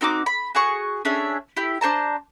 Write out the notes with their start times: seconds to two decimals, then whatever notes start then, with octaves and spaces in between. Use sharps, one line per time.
0.01 C4 D#4 F#4 D6
0.26 B5
0.55 F#4 G#4 C#6 D#6
1.05 C#4 D4 G#4 E5
1.57 E4 G4
1.81 D4 C5 A5 A#5